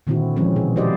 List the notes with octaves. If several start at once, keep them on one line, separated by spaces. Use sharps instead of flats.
A#2 D3 D#3 C4 E4 F#4
E3 F3 G#3 C4 C#4
B2 G#4
E4 F#4 G4 C5 D5 D#5